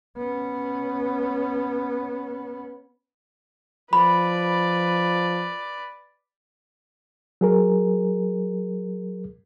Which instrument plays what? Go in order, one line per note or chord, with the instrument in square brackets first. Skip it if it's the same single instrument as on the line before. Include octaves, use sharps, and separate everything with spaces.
[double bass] B3 C#4
[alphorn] F3 [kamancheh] B4 D5 [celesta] B5
[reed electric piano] F#3 G#4 A#4